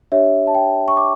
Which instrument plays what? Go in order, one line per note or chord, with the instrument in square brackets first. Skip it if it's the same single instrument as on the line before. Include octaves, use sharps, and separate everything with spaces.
[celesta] D4 G4 C#5 E5
A5
G5
C#6
D6